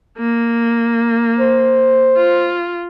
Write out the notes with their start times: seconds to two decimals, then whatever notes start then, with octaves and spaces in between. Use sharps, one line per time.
0.18 A#3
1.39 C5
2.17 F4